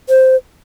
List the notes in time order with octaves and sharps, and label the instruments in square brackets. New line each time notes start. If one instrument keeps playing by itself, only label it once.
[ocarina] C5